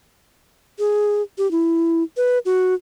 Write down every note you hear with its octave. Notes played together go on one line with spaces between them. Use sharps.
G#4
G4
E4
B4
F#4